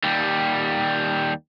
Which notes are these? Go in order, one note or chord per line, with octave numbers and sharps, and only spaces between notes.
D#2 G3